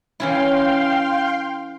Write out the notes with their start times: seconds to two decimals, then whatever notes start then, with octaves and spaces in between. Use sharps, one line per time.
0.20 E3 C#4 E4 F5 G5 C6